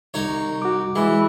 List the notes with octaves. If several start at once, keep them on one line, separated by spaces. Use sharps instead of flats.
C2 D#4 C#5
F#4 D6
E3 G#3